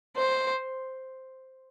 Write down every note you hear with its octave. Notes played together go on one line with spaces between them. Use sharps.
C5